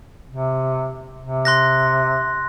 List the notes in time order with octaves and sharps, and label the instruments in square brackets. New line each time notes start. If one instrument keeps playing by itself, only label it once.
[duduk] C3
C3
[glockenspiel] C6 F#6 A#6